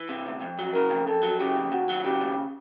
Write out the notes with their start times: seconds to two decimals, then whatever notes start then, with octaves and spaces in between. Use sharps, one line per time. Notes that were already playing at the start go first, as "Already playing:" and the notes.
Already playing: E3
0.09 C3
0.26 D2
0.41 F2
0.59 F#3
0.74 C#3 A#4
0.90 F2
1.07 F2 A4
1.23 F#3
1.40 C#3 G4
1.56 F2
1.72 D#2 F#4
1.89 F#3
2.05 C#3 G4
2.21 D#2